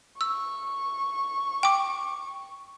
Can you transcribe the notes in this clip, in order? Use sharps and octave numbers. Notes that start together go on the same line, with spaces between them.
C#6 E6
G5 D6